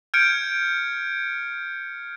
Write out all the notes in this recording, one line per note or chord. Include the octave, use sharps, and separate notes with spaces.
F6 G6 G#6 C#7 D7